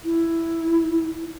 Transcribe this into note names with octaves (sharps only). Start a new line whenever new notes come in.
E4